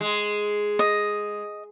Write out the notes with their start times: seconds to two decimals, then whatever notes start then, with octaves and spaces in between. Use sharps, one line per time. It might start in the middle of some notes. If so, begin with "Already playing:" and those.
0.01 G#3
0.79 D#5